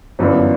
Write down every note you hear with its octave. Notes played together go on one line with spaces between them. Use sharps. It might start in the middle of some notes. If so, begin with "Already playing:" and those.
G1 F#2 E3 B3 D4